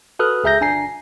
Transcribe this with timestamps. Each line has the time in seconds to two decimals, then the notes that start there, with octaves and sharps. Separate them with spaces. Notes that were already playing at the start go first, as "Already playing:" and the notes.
0.19 F#4 A4 B4 D#6 F6 F#6
0.44 C#2 G#4 E5 A#5 G6 A#6
0.61 G1 D4 G#5 A#5 C7